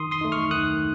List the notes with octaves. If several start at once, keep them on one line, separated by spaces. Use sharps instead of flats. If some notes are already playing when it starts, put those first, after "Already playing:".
Already playing: D#3 C6 D#6
C6 D#6
A3 D#4
C#6 F6
D#3 D#6 F#6